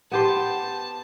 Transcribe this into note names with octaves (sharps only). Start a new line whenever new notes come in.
B3 G4 C5 A5